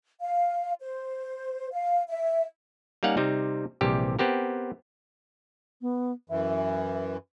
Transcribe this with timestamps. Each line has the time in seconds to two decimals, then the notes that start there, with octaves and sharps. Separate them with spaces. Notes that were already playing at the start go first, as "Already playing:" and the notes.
0.20 F5
0.80 C5
1.72 F5
2.08 E5
3.03 G3 A#3 C#4 D#4 F5 F#5
3.17 C3 G3 C4 D#4
3.81 A#1 C3 E3 G3 G4
4.19 B3 C4 G4 A#4
5.81 B3
6.30 F#2 E3 E5